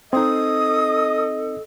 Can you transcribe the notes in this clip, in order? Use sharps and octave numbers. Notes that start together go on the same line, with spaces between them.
C4 D#4 A4 D#5 D#6